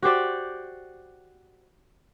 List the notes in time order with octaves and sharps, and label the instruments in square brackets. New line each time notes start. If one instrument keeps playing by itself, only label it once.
[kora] F#4 G4 C5 D5